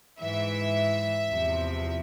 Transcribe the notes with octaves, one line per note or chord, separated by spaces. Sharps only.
G#2 E3 E5
E2 C3 F3